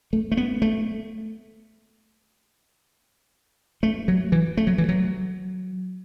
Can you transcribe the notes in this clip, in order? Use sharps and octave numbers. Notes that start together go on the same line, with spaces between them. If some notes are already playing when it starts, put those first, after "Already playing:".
A3
A3
B3
A3
A3
F#3
E3
A3
F#3
E3
F#3